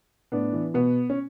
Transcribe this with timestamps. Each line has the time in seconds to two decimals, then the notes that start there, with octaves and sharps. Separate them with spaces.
0.32 A2 B3 D4
0.53 E3
0.74 B2 B3
1.10 C#4